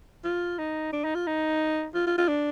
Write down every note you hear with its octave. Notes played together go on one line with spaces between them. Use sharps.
F4
D#4
D4
D#4
F4
D#4
F4
F4
F4
D4